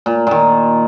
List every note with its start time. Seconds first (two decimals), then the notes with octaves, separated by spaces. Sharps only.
0.06 A#2
0.27 A#2 D#3